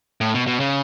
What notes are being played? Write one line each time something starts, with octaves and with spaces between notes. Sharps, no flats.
A2
B2
B2
C#3